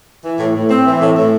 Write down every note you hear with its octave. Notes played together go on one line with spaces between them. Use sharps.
E3
A2
A2
C4
E3
A2
A2